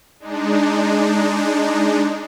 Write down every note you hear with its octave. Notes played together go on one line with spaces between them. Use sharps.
G#3 D4 D#4